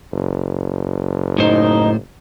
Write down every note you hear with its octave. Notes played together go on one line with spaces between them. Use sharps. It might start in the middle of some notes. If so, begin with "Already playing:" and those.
F#1
A2 D#4 C5